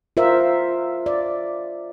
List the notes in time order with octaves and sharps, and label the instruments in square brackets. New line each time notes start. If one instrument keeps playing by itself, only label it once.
[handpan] F4 A#4 C5 E5
D5